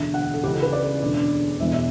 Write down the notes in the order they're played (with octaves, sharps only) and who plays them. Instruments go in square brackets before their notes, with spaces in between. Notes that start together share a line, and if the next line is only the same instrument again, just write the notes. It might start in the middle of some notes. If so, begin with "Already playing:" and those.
Already playing: [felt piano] E1 D2 D3 E5
F#5
A4
C#2 C#3 E3 G4
A4
B4
D5
E1 D2 D3
E1 E2 B2 E5
E5